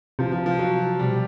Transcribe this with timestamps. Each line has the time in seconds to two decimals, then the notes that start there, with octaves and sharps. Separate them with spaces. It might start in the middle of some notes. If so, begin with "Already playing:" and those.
0.19 C3 F3
0.32 F3
0.46 F3
0.59 F#3
0.99 B2 G3